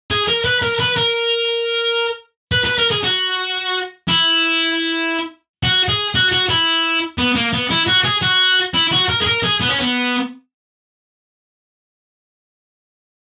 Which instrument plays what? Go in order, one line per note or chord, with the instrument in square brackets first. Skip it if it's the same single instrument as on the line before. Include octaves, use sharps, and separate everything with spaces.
[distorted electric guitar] G#4
A#4
B4
A#4
B4
A#4
B4
B4
A#4
G#4
F#4
E4
F#4
G#4
F#4
F#4
E4
B3
A#3
B3
E4
F#4
G#4
F#4
E4
F#4
A#4
G#4
A#4
G#4
B3
C#4
B3